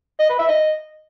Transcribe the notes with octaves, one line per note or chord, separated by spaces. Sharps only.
D#5
B4
E5
D#5